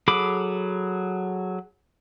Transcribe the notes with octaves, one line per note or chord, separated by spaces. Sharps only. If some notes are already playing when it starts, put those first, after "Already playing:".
F#3 G#4 A4 B5 D6